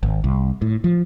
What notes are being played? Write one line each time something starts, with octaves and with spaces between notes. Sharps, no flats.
G#1
C2
A2
F3